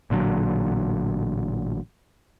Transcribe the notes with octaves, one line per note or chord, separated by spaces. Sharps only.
A1 A#2 D3 F#3